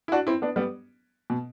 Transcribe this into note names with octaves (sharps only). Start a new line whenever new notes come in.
E4
D4 F#4
C4 E4
B3 D4
G3 B3
B2